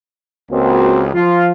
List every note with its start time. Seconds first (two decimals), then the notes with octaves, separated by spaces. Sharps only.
0.51 C#2 A#3 C4 F#4
1.14 F3 F4